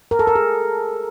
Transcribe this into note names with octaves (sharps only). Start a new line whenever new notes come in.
A#4
A4
A#4
G#4